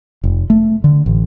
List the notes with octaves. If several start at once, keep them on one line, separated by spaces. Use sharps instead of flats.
F1
A3
D3
A1